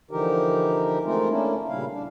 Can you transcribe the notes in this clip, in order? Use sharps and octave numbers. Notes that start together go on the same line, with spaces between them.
D3 E3 F3 D#4 G4 A#4
G#3 A3 C4 D#4 F4 A#4
A3 A#3 C#4 D4 E4
A#2 C#3 G3 E4 F5
D4